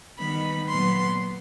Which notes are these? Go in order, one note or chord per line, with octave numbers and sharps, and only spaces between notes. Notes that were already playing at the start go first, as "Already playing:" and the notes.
D#3 G3 B3 B5
A#2 F#3 B3 C6